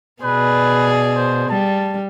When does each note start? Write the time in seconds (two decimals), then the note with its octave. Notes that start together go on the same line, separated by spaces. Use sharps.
0.23 B2 G#4 B4 D5
1.16 C5
1.50 G3 A5